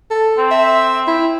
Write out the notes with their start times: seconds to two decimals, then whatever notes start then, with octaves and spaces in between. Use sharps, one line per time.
0.10 A4
0.38 C4
0.51 E5
1.07 E4